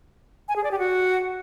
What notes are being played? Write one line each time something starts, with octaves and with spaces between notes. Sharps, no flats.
G#5
G#4
D5
G4
F#4